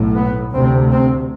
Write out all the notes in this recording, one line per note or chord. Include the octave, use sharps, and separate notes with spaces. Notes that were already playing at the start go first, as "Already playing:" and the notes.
Already playing: B1 A2
B3
D2 C3 C4
C4